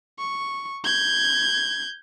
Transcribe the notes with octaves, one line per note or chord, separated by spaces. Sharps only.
C#6
G6 G#6